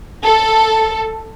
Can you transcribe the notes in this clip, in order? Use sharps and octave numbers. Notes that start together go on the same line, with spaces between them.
A4